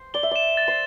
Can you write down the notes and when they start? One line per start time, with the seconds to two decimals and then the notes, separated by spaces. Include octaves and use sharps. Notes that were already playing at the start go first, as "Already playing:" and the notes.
Already playing: C5
0.14 D5 G7
0.23 E5
0.31 D5 E7
0.57 A6
0.68 C5